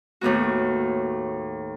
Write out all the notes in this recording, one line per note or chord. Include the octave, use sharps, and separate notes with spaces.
D#2 A2 B3 F#4